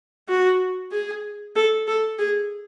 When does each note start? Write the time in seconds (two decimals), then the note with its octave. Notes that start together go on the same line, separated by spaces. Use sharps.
0.29 F#4
0.92 G#4
1.55 A4
1.87 A4
2.18 G#4